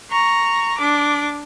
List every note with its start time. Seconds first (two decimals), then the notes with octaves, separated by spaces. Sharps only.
0.11 A#5 C#6
0.78 D4 D6